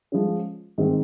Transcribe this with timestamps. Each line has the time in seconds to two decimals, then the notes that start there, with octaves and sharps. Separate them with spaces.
0.12 F3 G#3 C#4
0.78 G#2 D#3 G#3 C4